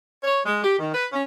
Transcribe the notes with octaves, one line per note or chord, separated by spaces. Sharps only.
C#5
G#3
G4
D#3
B4
C#4